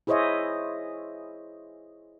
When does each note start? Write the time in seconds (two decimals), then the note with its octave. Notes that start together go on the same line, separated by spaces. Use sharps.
0.07 E4 G#4 C5 C#5 D#5 E5